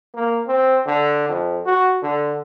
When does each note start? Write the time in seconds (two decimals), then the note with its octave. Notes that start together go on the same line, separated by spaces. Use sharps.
0.15 A#3
0.47 C4
0.86 D3
1.29 F2
1.66 F#4
2.03 D3